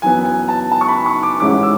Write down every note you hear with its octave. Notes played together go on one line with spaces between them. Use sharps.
F#2 E3 B3 G#5
G#5
A5
A5
C#6
B5
C#6
D6
A1 G#2 G#3 C#4 E4 D6
E6